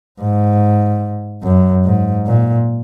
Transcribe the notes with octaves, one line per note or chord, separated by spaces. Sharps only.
G#2
F#2
G#2
A#2